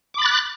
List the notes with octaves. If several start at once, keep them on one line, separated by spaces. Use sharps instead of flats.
B5 D6 F#6 A6